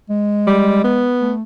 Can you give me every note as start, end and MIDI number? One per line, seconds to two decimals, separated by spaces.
0.10 1.13 56
0.47 0.82 55
0.84 1.33 59
1.21 1.42 57